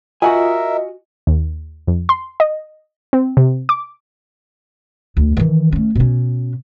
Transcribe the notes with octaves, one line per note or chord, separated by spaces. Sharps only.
F4 F#4 A#4 D#5 E5 F#5 G#5
D#2
F2
C6
D#5
C4
C3
D6
D2
D#3 E3
A3 C#4
B2 C#4